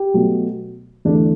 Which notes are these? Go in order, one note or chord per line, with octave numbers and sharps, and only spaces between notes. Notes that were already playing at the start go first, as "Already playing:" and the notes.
Already playing: G4
B2 F#3 A3
E2 D3 A3 D4